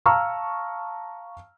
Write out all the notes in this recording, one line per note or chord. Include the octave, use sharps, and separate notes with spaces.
F5 A5 A#5 C#6 E6 F6